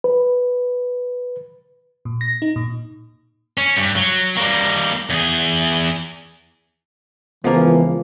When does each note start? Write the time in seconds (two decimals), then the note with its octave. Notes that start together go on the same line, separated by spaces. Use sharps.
0.04 B4
2.05 A#2
2.21 A#6
2.42 D#4
2.56 A#2
3.58 C#4
3.77 G2
3.96 F#3
4.36 G3 A#3
5.10 E2 G#4
7.44 C#2 E3 F3 A#3 B3 A#4